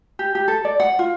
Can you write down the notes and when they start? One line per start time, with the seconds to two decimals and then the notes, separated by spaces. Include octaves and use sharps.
0.19 G4
0.35 G4
0.48 A4
0.65 D5
0.80 F#5
0.99 F4